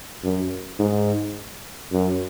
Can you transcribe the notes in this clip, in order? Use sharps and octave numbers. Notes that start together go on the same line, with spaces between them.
F#2
G#2
F#2